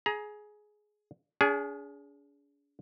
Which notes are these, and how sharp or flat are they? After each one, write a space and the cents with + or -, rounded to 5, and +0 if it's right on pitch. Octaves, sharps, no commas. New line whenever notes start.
G#4 +15 A#5 +25
D4 -45 G#4 +0